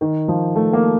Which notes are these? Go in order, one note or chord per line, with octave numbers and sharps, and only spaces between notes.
D#3
F3
A3
A#3